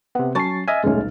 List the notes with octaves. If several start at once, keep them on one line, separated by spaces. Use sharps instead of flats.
C3 B3 F#5
F#3 C#4 A5 C#6 A6 C7
D#5 E5 G#5 F6
D#1 B1 G#3 A3 C#4